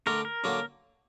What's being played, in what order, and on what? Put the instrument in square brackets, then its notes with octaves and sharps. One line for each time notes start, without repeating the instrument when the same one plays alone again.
[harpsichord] D3 A3 D4 [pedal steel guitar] A#4
[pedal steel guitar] A#4
[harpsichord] D3 F#3 A#3 D4